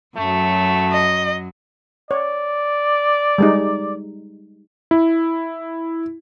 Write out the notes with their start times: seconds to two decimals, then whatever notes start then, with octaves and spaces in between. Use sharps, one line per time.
0.17 F#2 F#3 A3
0.93 D#5
2.11 C#5 D5
3.38 G3 G#3 D#4
4.91 E4